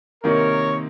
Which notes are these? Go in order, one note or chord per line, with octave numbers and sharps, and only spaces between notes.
C3 D#3 A#3 A#4 C#5